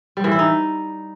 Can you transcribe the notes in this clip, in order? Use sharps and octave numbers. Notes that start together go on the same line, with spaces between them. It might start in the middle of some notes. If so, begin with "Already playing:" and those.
G3
E3
E4
D#4